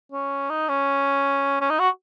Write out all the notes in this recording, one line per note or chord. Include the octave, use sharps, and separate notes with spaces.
C#4
D#4
C#4
C#4
D#4
F#4